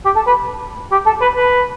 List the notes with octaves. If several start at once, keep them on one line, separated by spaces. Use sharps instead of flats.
G4
A4
B4
G4
A4
B4
B4